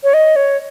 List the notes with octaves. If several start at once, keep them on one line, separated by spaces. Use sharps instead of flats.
C#5
D#5
C#5